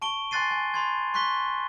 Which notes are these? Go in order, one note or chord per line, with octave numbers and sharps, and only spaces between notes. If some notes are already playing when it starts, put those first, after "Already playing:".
A5 C#6 D7 G7
G#5 C6 F#6 A6 C7 D#7
G#5
B5 C6 G#6
C6 C#6 F#6 B6 G7